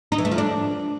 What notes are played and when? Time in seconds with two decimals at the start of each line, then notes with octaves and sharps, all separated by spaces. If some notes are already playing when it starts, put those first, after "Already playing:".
0.12 D#4
0.18 E3
0.25 A3
0.31 F3
0.38 D4